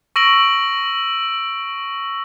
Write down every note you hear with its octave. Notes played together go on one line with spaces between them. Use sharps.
C#6 E6 A#6 D7 E7 F#7